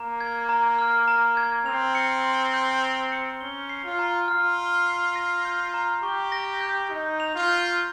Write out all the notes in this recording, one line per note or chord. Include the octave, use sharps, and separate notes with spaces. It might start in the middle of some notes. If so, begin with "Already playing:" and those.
Already playing: A#3 A#5
G#6
A#5
F6
A#5
G#6
C4 F7
C#7
C6
G6
F7
C#7
C#4 G7
C7
F4
A#5
F4 F6
G7
C7
A#6
G6
A#5
G4 C#6
A#6
G6
D#4 G6
F7
F4
G6